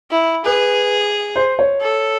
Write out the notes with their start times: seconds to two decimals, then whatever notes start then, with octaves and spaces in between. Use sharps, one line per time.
0.11 E4
0.46 G#4 B4
1.36 C5
1.59 C#5
1.81 A4